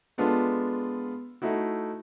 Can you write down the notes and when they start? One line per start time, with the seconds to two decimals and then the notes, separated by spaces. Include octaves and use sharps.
0.18 G#3 B3 D4 F4 A4
1.42 A3 D#4 E4 F#4